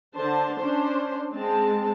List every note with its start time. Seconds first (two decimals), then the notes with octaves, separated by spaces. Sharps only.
0.14 D3 D4 C5 A5
0.55 C#4 D4 C5
1.33 G#3 C4 A5